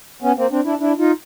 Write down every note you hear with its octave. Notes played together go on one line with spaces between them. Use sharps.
B3 C#4
A#3 C4
C4 D4
D4 E4
D4 E4
D#4 F4